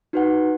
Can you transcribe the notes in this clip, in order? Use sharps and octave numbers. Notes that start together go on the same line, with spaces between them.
D#4 F#4 B4 F#5